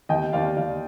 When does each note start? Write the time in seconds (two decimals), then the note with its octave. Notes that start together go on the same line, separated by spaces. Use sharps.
0.09 D#2 D#5 G5
0.33 D#2 D5 F5
0.56 D#2 D5 F5